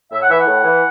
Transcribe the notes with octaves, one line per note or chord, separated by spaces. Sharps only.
A2 E5
F#5
E3 E5
F#5
A2
E3